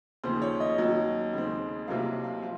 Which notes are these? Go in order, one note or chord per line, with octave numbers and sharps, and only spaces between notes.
D#2 C#3 F3 C5
C#5
D#5
D#2 D#3 F#3
D#2 C#3 G#3 C4
C2 C3 F#3 A#3 F5
F5
F3 F5